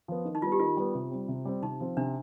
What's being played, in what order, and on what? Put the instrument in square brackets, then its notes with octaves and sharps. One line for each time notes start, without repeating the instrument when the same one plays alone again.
[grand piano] F3 B3
D#3
[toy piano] D#4
[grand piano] G3 B3 [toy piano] F4
[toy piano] G4
[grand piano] D#3 [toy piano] F4
[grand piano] G3 B3
C3
G3 C4
C3
G3 C4
[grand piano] C3 [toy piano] D#4
[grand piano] F3 C4 F4
[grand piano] C3 [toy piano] D4